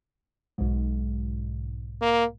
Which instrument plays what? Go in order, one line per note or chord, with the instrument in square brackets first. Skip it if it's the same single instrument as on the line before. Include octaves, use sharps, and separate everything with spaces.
[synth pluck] B1 G#2
[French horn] A#3